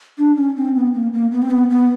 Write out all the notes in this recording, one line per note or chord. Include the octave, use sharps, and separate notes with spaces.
D4
C#4
C4
B3
A#3
A#3
B3
C4
B3
B3